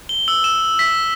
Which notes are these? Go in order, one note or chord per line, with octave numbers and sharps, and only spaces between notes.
G7
E6
E7
B6